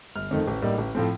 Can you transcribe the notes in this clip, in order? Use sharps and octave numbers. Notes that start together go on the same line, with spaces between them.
G1 F6
F2 D#3 A3
A1
A2 G3 A#3 D#4
A1
A2 F3 A3 C4